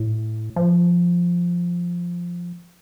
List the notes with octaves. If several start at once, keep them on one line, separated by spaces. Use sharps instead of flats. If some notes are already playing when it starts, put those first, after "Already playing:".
Already playing: A2
F3